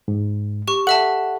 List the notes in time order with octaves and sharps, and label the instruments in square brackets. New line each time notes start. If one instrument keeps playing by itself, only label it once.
[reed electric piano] G#2
[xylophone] G4 C#6
[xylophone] A4 E5 A5 [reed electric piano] F#5